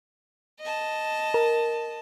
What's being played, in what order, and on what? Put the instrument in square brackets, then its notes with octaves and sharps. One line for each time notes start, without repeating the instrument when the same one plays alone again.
[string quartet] D#5 A5
[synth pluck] A#4